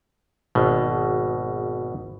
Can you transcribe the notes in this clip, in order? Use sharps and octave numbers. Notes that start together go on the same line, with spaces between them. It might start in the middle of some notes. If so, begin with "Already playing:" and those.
G#1 B2